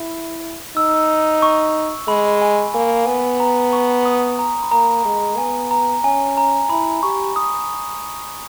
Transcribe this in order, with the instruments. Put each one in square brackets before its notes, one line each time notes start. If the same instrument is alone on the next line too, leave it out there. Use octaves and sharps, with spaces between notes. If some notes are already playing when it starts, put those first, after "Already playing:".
Already playing: [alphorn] E4
[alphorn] D#4 [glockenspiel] E6
[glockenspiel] C#6
[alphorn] G#3 [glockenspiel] B5
[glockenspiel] G#5
[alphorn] A#3 [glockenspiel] G#5
[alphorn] B3 [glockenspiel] G#5
[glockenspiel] A#5
C#6
D#6
A#5
B5
[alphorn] A#3 [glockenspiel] A#5
[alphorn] G#3
[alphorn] B3 [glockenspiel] G#5
[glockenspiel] A#5
[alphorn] C#4 [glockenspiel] G#5
[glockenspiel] A#5
[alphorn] E4 [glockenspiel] B5
[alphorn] G4 [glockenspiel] C#6
[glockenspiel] D#6